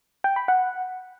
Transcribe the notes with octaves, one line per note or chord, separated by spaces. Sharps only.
G5
B5
F#5